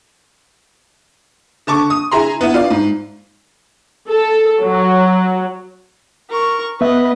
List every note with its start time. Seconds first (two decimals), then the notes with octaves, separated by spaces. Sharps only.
1.67 D3 A5 C#6 D6
1.90 D#6
2.12 E4 G#4 A#5 C6
2.41 B3 E4
2.54 F4 D5 F5
2.71 G#2
4.08 A4
4.61 F#3
6.31 A#4 C#6
6.81 B3 B4 D#5 E5